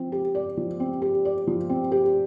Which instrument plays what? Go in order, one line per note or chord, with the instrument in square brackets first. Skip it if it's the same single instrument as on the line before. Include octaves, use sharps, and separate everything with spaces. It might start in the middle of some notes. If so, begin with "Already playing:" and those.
Already playing: [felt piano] F3 C4
G4
D5
F3
C4
G4
D5
F3
C4
G4